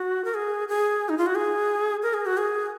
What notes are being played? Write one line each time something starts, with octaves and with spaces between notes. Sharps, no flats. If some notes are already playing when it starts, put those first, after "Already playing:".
Already playing: F#4
A#4
G#4
G#4
D#4
F4
F#4
G#4
A#4
G#4
F#4
G#4